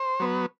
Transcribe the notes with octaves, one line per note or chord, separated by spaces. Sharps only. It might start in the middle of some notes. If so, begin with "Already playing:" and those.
Already playing: C5
F#3 B3